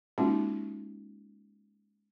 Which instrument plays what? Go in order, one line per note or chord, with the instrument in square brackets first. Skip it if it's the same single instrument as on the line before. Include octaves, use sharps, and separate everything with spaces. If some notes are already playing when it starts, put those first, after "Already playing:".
[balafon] G#3 A#3 C#4 D#4 F4 F#4